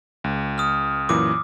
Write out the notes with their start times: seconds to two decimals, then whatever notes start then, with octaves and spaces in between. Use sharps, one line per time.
0.24 C#2
0.58 D#6 F6
1.09 F#2 A#2 E3 D6